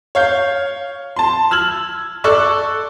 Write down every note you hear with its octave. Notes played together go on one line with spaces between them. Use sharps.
C#5 F5 G6
A5 C6
E6 F6 G#6 F#7
A4 D5 C#6 E6 F#6